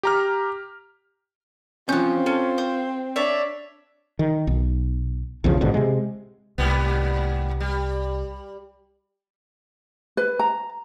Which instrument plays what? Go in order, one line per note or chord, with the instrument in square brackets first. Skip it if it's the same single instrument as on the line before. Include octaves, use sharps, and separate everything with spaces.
[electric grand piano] G4 A#5 F6
[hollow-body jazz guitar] F3 C#4 [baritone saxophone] C4 [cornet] F4 [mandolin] F#6 G6
[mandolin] C#4 [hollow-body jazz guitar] A4
[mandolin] C5
[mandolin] D4 C#5 E5 [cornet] D5
[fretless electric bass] D#3
B1
B1 E2 C#3 F3
A1 G#2 B2 D3
C3 G#3
[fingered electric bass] C2 [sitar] G#2 G3 B3
[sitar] G3
[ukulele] B4
A#5